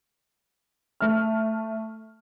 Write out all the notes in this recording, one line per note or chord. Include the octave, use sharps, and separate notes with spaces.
A3 F6